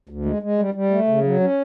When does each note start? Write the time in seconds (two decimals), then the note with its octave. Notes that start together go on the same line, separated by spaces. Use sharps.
0.09 D2
0.25 G#3
0.42 G#3
0.59 G3
0.74 G3
0.90 A3
1.07 C#3
1.23 F#3
1.40 C#4